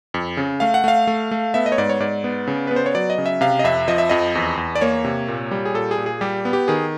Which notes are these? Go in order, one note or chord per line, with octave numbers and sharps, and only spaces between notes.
F2
C#3
A3 F5
F#5
A3 F5
A3
A3
B3 E5
D#5
C#5
G#2 D5
C#5
G#2 D5
B3
C#3
B3 B4
C5
C#5
F#3 D5
D#5
C#3
E5
C3 F5
D#5
F2 E5
F3 D#5
E5
F2 D#5
E2
E2
D5
A#3 C#5
C3
A#2
G3
G#4
A#2 A4
G#4
A#2
G#4
G3 G4
B3
G4
D#3 G#4